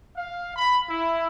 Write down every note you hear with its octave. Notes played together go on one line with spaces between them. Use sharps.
F5
B5
E4